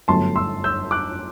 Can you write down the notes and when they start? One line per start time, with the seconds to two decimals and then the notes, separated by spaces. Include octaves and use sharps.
0.08 G1 F#2 D3 F#3 A3 A5 C6
0.36 C6 E6
0.64 E6 G6
0.91 D6 F#6